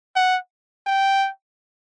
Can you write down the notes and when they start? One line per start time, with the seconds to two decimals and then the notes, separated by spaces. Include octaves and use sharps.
0.16 F#5
0.86 G5